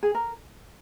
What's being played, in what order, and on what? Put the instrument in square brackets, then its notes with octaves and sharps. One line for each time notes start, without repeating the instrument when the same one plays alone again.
[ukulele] G#4
A#4